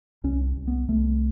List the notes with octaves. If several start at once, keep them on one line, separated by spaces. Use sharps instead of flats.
C2 C#4
C2
B3
C2 A3